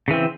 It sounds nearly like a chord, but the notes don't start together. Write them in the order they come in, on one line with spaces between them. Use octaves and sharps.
C#3 E3 C4